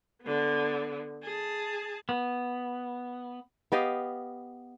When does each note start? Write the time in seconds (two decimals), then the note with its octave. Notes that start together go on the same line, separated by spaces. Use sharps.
0.23 D3 B3
1.23 G#4 A5
2.09 B3
3.72 B3 G4 D#5 F5